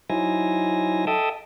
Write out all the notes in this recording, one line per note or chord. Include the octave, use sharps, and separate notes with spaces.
F#3 D#4 E4 C5 G#5 A#6
A4 D#5 E5 G5 A5 D#6